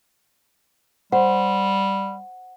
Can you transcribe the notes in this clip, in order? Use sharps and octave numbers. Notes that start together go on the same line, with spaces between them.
G3 C5 F#5